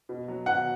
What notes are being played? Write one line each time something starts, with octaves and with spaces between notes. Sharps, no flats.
B2
F#3
B2 F#5